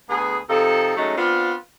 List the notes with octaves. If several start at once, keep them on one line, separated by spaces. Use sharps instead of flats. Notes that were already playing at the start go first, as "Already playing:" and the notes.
D2 B3 G#4
C3 F3 D#4 A4
F#3 G#3 A3 C#4 D#4
B3 C4 D4 F4